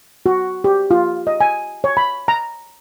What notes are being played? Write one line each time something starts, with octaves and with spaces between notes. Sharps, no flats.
F#4
G4
F4
D#5
G#5
C#5
B5
A#5